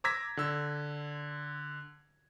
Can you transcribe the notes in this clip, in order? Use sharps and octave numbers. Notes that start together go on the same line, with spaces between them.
A#5 D6 E6 G#6 A#6 B6
D3 E6